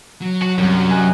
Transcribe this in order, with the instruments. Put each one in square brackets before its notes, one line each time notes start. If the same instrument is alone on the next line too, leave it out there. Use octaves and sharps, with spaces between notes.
[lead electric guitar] F#3
[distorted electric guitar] F#4
[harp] C2 [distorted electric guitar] F#2
[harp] D#5 G#5 F#6